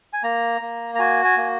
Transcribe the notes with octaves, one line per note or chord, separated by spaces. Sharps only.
G#5
A#3 A#5
A#3
A#5
F#4 G#5
G#5
A#3